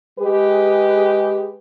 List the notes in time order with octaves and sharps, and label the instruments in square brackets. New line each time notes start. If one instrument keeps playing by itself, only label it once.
[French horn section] G#3 G4 G#4 B4